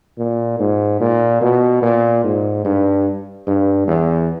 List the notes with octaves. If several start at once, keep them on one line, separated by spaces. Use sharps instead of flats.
A#2
G#2
A#2
B2
A#2
G#2
G2
G2
E2